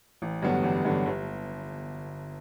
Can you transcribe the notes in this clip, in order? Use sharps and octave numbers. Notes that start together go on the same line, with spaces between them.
A1
G2 D3 F#3 B3
A1
G2 D3 F#3 B3
G1